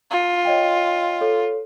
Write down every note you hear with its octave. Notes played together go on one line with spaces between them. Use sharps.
F4
C#5 D#5 G5
A4 C#5